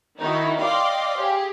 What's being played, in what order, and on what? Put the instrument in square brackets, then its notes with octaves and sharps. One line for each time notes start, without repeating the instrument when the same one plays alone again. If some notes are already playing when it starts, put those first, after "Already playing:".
[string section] D#3 D#4 E4 F#4
D5 D#5 F5 G5 C6 D6
G4 G#4